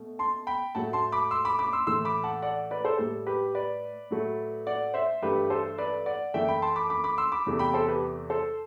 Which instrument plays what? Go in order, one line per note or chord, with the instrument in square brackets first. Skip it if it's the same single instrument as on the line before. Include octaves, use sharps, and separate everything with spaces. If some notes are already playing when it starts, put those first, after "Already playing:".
Already playing: [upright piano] B2 A3
A5 C6
G5 B5
A2 F#3 A3 F#5 A5
A5 C6
B5 D6
C6 E6
B5 D6
B5 D6
C6 E6
A2 E3 A3 C6 E6
B5 D6
F#5 A5
D5 F#5
B4 D5
A4 C5
A2 G3 A4
G4 B4
B4 D5
A2 F#3 A3
D5 F#5
C5 E5
G2 E3 A3 G4 B4
A4 C5
B4 D5
D5 F#5
F#2 E3 A3 E5 G5
G5 B5
A5 C6
B5 D6
B5 D6
B5 D6
C6 E6
B5 D6
E2 C3 E3 A3
G5 B5
A4 C5
G4 B4
A4 C5